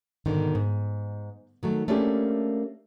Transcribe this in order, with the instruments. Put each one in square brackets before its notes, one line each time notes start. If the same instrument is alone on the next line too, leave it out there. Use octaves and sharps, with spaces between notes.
[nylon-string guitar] G#2 B2 D3 D#3
G#2
D#3 F#3 A3
A3 A#3 C#4 D4 G4 G#4